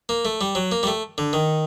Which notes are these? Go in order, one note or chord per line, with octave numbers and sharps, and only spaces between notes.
A#3
A3
G3
F#3
A#3
G3
A3
D3
D#3